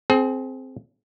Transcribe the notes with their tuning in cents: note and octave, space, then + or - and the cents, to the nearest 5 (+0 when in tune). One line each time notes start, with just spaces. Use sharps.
C4 +0 G#4 +35